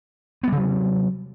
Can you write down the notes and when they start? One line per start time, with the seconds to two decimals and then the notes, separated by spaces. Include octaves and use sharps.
0.43 B3
0.48 G3
0.52 C3
0.56 F#3